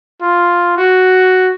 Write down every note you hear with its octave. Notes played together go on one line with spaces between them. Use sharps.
F4
F#4